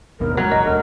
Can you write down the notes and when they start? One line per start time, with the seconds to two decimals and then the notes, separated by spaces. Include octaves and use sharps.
0.20 G#1 D#2 B2 A#4
0.37 C#3 F#3 G#3 A#5
0.52 A1 D#5
0.65 E1 D2 D3 A#4